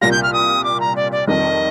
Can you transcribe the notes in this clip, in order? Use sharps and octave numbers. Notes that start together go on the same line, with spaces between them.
C2 A#2 G3 A#3 F4 A#6
G6
F6
D#6
D6
A#5
D5
D5
F1 F2 D#3 G3 D#5